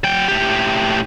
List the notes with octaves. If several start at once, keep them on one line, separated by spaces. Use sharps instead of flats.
F#3 G5
A2 G4